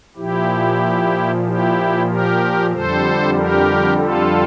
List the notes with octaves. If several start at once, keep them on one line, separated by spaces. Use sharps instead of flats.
A#2 F3 E4 G4
E4 G4
G4 A#4
F2 D3 G3 A4 C5
G4 A#4
F4 A4